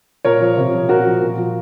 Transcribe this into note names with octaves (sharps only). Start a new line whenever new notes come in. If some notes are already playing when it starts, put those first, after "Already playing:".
A#2 A#4 C#5
F3
C3
F3
A#2 F#4 A#4
F3
A#2
F3